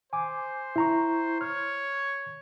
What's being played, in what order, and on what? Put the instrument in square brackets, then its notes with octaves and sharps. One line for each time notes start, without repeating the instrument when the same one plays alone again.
[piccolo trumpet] C5 [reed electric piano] G#5 D6
[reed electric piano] E4 A#5 C#6
[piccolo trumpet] C#5 [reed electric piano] F6